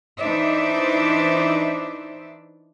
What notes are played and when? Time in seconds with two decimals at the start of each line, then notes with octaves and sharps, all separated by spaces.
0.19 E3 D4 D#4 C5 D5 E5